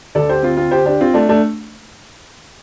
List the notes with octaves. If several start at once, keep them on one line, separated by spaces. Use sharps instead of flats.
D2 D3 A4 D5
G4 C5
C4 F4
C4 F4
G4 C5
D4 G4
C4 F4
A3 D4
A3 D4